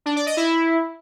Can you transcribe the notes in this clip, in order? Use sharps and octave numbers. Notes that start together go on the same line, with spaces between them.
D4
D5
D#5
E4